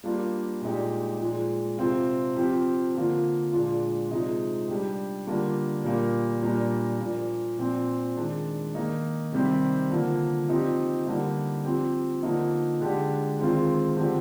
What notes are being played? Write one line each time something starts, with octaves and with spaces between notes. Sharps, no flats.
G3 A#3 D4 F4
A#2 G#3 D#4 G4
A#2 F3 G#3
C3 F3 C4 F4
F3 C4 G4
D3 F3 A#3 F4
A#2 G#3 D4 F4
C3 F3 G#3 D#4
G3 D4 G4
D3 G3 A#3 D4 F4
A#2 G3 A#3
A#2 G3 A#3 D4
A#2 F3 A#3
A#2 F3 C4
D#3 G#3 D4
D#3 A#3 D#4
C3 D#3 G3 C4 G4
D3 F3 A#3
F3 C4 D#4 G4
D3 G3 A#3 D#4
F3 C4 G4
D3 F3 A#3 D#4
D3 G#3 D4 G4
D#3 G#3 C4 F4
D3 F3 C4 G4